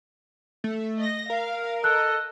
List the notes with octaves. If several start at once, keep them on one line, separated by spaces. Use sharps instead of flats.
A3
D#5 A#6
A#4 F5
A4 D#5 F#6